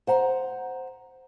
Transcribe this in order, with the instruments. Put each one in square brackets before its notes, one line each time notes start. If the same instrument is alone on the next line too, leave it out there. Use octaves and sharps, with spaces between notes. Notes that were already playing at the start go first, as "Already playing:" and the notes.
[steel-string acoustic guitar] C5 F#5 A#5